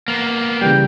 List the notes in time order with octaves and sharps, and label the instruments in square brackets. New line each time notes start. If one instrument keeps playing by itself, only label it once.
[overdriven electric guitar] A#3 B3
[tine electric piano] C#3 E3 G3 [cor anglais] G5